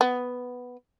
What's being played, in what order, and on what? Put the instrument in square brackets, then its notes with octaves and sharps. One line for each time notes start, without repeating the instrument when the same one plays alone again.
[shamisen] B3